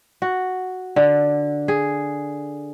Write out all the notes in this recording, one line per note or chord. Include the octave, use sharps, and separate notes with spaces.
F#4
D3
G#4